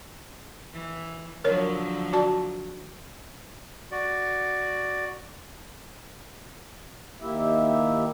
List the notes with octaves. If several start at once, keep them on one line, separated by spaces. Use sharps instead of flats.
E3
D3 F3 F#3 A#4 C#5
F#4 D5 A5
F#4 D5
D#2 A#3 E4 G4 E5